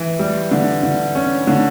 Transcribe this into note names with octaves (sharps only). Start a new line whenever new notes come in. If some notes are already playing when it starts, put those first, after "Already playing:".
Already playing: E3
G3
D3
D3
C#4
D3